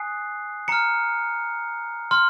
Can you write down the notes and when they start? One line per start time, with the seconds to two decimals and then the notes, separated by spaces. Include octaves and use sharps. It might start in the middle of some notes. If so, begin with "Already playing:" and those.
Already playing: G#5 D#6 F#6 C7
0.68 A#5 F6 C#7
2.11 C6 F6